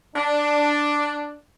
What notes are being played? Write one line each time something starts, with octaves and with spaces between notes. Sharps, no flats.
D4